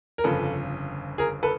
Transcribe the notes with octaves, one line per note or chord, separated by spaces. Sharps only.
A#4
G1 F2 C#3 A4 B4
G#4 A#4
A4 B4